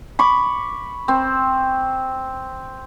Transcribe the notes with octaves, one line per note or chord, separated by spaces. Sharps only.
B5 C#6 D6
C4